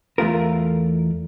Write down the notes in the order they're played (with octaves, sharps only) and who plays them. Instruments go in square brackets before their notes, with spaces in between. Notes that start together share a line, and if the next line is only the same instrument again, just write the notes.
[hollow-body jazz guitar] E2 A3 F4 A#4